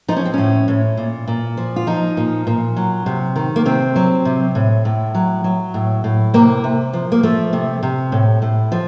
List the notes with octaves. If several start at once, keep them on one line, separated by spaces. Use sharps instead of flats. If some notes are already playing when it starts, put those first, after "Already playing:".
F3 D#4
C#4
C4
A2 C#4
A2
A#2
A#2
F3
F4
F3 D#4
A#2
A#2
F#3
C3
D#3
A#3
C3 C4
F#3
C3
A2
A2
F#3
F#3
A2
A2
C3 A#3
C3
F3
A#3
F3 A3
C3
C3
A2
A2
F3